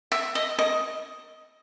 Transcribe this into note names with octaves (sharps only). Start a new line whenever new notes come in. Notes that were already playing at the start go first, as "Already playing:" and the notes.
E5
D#5
D#5